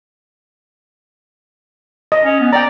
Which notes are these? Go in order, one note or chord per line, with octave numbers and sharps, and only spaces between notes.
D#5
C#4
B3
D5 G5 A#5